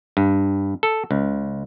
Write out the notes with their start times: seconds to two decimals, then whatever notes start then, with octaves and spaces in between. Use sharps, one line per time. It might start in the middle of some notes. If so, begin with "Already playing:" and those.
0.17 G2
0.83 A4
1.11 C#2